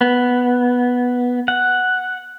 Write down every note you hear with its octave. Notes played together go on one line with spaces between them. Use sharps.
B3
F#5